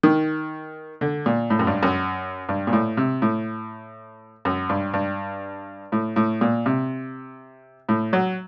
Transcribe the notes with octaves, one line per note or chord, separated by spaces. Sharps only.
D#3
D3
A#2
A2
F#2
G2
F#2
G2
A#2
A2
C3
A2
F#2
G2
G2
A2
A2
A#2
C3
A2
F#3